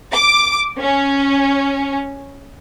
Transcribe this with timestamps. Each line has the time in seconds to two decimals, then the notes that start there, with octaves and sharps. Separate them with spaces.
0.14 D6
0.80 C#4